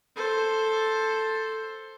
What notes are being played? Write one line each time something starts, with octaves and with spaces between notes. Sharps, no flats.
A4 C5